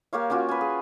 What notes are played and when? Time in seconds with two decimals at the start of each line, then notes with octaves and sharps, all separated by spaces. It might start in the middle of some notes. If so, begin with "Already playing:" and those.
0.13 A#3 G4 C#5 F5
0.30 A#3 C#4 F4 F#4
0.49 B4 G#5
0.61 G#4